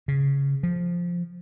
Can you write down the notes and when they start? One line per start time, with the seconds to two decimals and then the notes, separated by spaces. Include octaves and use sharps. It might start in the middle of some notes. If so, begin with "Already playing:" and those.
0.08 C#3
0.63 F3